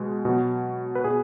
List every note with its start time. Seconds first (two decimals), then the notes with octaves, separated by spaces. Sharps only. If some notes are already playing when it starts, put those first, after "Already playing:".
Already playing: B2 G#3
0.25 B2 F#3
0.95 B4
1.04 B2 G#4